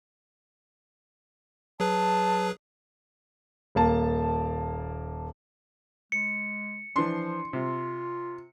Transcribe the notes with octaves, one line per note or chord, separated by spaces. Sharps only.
F#3 G#4 B4 A5
D#1 A#3 A5
G#3 C#7
E3 F3 D4 C6
C3 F4